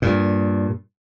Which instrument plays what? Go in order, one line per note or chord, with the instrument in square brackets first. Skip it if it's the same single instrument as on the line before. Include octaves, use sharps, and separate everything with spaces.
[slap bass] G2 A#2